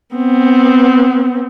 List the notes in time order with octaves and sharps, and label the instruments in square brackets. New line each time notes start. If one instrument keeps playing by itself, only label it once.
[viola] B3 C4